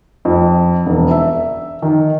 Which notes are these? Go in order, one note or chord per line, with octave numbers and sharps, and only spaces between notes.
F2
E1
E5
D#3